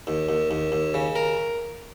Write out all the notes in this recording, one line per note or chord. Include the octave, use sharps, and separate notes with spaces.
D#2
D#2
D#2
D#2
C#3
A#4